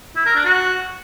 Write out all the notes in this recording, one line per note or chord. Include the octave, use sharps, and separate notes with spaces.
E4
A#4
D4
F#4